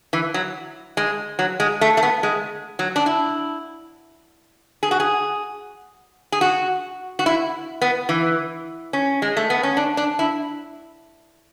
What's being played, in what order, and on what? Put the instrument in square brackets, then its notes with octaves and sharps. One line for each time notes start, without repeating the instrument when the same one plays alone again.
[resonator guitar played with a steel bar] E3
F#3
G#3
F#3
G#3
A3
A3
B3
G#3
F#3
D4
E4
G#4
F#4
G#4
G#4
F#4
F#4
E4
B3
E3
C#4
G#3
A3
B3
C#4
D4
D4
E4